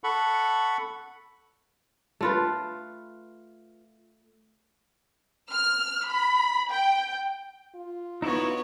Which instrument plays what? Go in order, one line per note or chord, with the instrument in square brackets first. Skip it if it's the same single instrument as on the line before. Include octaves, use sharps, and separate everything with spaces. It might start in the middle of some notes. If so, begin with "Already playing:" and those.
[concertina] A4 F#5 B5 C#6
[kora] A3 F4 B4
[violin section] F6
B5
G5
[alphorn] F4
[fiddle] B3 C#5 [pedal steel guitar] D#4 E4 F#4